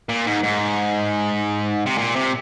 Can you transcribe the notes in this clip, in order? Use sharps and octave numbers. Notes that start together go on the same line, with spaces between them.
A#2
G#2
G#2
C3
A#2
C3